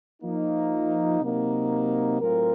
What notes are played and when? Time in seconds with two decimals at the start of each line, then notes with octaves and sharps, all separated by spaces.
0.22 F3 A#3 D#4
1.21 C3 F#3 A#3 D#4
2.21 A2 F#3 C4 F4 A#4